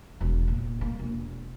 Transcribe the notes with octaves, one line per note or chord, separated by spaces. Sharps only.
E1
A#2
A#3
E1